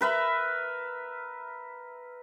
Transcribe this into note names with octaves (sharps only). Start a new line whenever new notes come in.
A#4 B4 E5